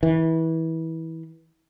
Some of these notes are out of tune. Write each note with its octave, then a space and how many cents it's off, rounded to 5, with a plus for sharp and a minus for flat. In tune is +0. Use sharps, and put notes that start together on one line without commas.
E3 -25